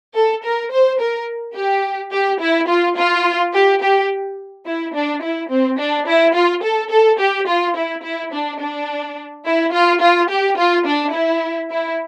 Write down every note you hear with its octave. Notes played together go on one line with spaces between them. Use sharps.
A4
A#4
C5
A#4
G4
G4
E4
F4
F4
G4
G4
E4
D4
E4
C4
D4
E4
F4
A4
A4
G4
F4
E4
E4
D4
D4
E4
F4
F4
G4
F4
D4
E4
E4